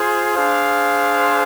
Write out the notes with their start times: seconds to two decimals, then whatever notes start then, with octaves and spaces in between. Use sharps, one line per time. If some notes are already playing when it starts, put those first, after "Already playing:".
Already playing: F4 G#4 C5
0.34 D4 G#4 C5 F5